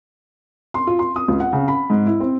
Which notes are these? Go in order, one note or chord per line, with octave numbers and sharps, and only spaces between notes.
C6
F4
C6
D#6
C#2
F#5
C#3
B5
G#2
E4
C4